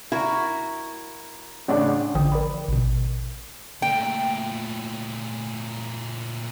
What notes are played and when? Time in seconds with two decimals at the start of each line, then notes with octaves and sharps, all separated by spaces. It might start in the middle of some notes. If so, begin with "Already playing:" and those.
0.12 E4 F#4 A#4
1.68 A1 C#3 D4
2.15 A1 D3 F3 G5 D#6
2.32 A#4 D5 B5
2.68 A1 B2
3.82 A#2 A3 G5